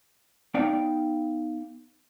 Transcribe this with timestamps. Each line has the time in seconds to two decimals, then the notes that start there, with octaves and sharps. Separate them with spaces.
0.54 B3 D#4 D5 F5 G5